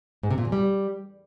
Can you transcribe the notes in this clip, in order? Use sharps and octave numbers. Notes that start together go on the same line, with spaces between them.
G#2
C3
A#2
E2
G3